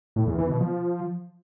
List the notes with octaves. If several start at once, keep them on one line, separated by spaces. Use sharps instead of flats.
A2
E2
E3
B2
F3